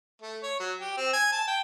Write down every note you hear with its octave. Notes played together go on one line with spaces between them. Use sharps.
A3
C#5
F#3
G4
C4
G#5
A5
G5